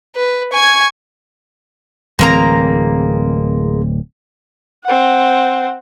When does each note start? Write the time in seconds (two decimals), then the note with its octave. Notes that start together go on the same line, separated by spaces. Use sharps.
0.16 B4
0.53 G#5 C#6 G#6
2.19 D1 E3 G#3 A#3 C4 A#5
4.84 C4 F#5